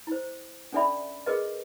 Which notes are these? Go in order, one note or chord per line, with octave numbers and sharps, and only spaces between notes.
E4 C5
C#4 D4 A4 D5 E5 B5
G#4 A#4 B4 D#5